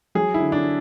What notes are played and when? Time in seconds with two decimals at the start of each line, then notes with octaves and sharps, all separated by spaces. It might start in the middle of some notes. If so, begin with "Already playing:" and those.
0.15 F#3 G#4
0.34 E4
0.40 D3
0.52 D4